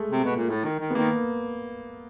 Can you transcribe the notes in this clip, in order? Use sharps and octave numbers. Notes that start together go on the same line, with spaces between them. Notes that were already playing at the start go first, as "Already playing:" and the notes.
Already playing: G#3 A3
C3
B2
A#2
A2
D#3
D#3
B3
D#3 A#3